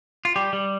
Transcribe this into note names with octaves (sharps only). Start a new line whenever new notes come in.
F4
G3 G4
G3